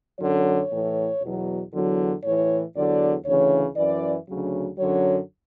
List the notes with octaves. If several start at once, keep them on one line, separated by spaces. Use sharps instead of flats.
F#2 D3 F#3 C#5
A2 E3
E2 B2 F#3
E2 D3 F#3
A2 E3 C#5
E2 D3 F#3 D5
D2 C#3 E3 C#5
F#2 E3 D5
D2 C#3 F#3
F#2 D3 F#3 C#5